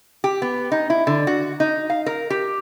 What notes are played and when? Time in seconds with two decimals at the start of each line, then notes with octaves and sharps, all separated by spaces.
0.24 G4
0.42 B3
0.72 D#4
0.90 E4
1.07 D3
1.27 F#4
1.60 D#4
1.90 F5
2.06 A#4
2.30 G4